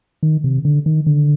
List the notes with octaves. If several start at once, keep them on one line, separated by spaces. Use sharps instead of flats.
D#3
C3
D3
D#3
D3